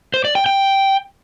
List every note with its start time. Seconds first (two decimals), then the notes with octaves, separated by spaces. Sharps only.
0.14 C5
0.25 D5
0.35 G5
0.46 G5